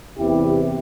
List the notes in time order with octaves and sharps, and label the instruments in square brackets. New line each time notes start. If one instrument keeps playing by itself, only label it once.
[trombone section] E2 C3 G3 B3 E4 G4